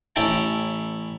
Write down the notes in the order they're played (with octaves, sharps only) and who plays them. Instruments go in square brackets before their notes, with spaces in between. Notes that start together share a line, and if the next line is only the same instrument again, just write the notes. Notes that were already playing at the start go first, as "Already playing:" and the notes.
[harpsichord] A1 C#4 E4 E5 G5 A5